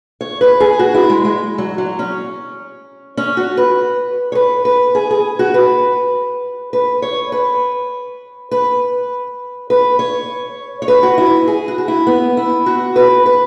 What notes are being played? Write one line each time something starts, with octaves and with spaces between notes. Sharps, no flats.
C#5
B4
G#4
F#4
E4
G#3
G#3
F#3
F#3
C#4
C#4
F#4
B4
C#5
B4
B4
G#4
G#4
F#4
B4
B4
C#5
B4
B4
B4
C#5
C#5
B4
F#4
E4
G#4
F#4
F#4
E4
B3
E4
F#4
B4
B4